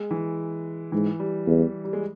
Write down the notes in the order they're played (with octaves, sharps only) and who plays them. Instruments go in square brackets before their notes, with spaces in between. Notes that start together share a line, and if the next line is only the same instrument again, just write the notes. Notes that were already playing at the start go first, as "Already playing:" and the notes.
Already playing: [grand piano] G#3
E3
[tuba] G#2 [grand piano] E3
[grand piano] G3
[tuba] E2
[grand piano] G3
G#3